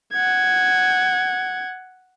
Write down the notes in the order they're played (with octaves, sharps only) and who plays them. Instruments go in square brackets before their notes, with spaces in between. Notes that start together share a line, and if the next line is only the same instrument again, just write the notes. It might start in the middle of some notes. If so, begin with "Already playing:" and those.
[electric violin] F#5 G#6